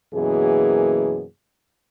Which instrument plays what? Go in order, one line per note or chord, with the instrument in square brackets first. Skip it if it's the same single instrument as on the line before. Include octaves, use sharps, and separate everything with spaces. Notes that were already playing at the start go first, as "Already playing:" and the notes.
[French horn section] F#2 B2 E3 A#3 G#4